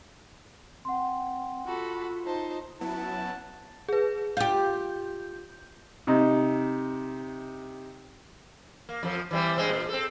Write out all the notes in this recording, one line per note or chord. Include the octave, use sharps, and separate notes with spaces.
C4 F#5 C6
F4 F#4 A4 B5
D#4 C5 A5
F#3 B3 C#4 E4 F#5 A5
G#4 B4
F4 G4 G6
C3 D#4
A#3
F2 F3
E3 G3 C4
G2 G#3 C4
A#2
C4 A4